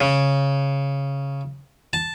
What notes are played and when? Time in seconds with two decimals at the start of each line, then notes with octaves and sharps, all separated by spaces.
0.01 C#3
1.93 A5